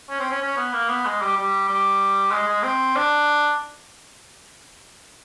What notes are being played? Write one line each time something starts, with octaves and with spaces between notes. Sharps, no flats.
C#4
C4
C#4
C#4
B3
A#3
B3
G#3
G3
G3
G3
G#3
G#3
C4
D4